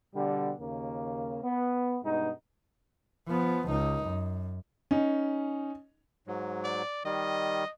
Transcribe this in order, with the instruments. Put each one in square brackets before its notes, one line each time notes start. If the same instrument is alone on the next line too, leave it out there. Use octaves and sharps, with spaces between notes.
[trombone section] B2 D3 G3
D#2 C#3 A#3
B3
G2 B2 G#3 D#4
[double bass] F3 B3
C#2 D#4
F#2
[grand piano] C#4 D#4
[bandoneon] G#2 F#3
[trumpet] D5
[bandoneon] D#3 G3 [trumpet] D#5